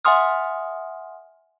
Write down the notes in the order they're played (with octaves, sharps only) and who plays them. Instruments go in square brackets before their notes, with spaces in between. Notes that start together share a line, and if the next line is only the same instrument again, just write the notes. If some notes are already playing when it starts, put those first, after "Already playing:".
[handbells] E5 F#5 G#5 C6 D#6 F6